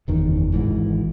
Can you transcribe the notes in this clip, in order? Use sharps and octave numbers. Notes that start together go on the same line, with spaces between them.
F#1 E2 D#3
G#1 G#2 E3